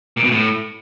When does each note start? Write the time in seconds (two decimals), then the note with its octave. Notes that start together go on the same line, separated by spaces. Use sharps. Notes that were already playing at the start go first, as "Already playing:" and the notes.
0.17 A#2
0.24 B2
0.31 A2